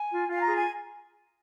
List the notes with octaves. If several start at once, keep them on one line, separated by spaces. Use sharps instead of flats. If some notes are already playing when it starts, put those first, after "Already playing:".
Already playing: G#5
F4
F4 F5
G#5
G#4 A#5
G#5